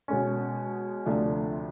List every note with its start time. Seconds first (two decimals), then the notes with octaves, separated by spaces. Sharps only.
0.08 B2 G#3 C#4
1.06 D2 C3 F3 A3 D4